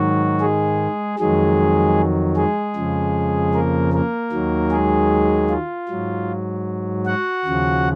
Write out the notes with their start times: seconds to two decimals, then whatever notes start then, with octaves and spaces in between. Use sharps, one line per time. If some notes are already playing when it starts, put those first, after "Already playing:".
Already playing: G#2 D#3 F#3 F#4
0.41 G#3 G#4
1.19 F2 D#3 F#3 G#3 G#4
2.37 G#3 G#4
2.76 F2 C#3 F3
3.54 A#3 A#4
3.93 A#3 A#4
4.32 D#2 D#3 F#3
4.71 G#3 G#4
5.50 F4
5.89 G#2 F#3
7.06 F#4 F#5
7.45 D#2 C#3 F3